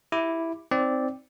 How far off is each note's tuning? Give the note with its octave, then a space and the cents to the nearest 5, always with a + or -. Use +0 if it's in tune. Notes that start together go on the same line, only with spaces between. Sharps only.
E4 +0 G4 +10 D6 +0
C4 +0 D#4 +15 D5 -5